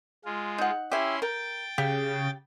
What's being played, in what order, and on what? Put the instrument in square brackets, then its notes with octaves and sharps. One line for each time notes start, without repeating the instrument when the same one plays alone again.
[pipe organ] G#3 F4
[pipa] D#4 F#5
[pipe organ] C#4 E4 C6 [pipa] G4 E5
[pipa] A#4 [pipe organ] G5 A6
[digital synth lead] C#3 [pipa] G4